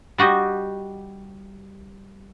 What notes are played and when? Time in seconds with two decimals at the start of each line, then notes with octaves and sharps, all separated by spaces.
0.18 G3 F#4 G4 D#5